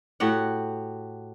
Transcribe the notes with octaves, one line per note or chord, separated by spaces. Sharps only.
A2 F#4 G4 F#5